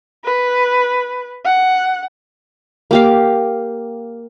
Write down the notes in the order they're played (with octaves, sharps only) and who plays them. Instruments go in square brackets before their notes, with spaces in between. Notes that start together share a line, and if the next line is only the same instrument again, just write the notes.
[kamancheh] B4
F#5
[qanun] A#3 G4 F5